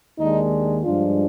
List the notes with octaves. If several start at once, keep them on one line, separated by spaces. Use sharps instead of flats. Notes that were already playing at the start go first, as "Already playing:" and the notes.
D#2 D#3 G#3 D4 D#4
G2 F3 G#3 D4 F4